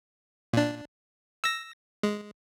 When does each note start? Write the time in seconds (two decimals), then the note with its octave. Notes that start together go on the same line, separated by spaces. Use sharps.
0.53 A#2 D4
1.44 E6 A#6
2.03 G#3